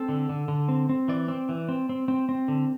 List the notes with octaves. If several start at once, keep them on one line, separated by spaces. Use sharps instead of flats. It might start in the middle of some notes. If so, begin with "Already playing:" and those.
Already playing: C4 A4
D3
D3
D3
C4
C4
E3 D5
C4
E3
C4
C4
C4
C4
D3